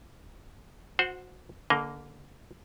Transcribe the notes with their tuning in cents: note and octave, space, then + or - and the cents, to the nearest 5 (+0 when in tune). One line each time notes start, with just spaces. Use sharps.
F#4 -25 C5 +0 F#5 +0
D3 -30 A#3 +0 D#5 +0